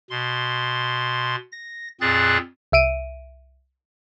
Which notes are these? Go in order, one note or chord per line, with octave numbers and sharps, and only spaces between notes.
B2 C6
A#6
F2 A#2 C4 G#4 F#6 A6
C2 E5 D7 D#7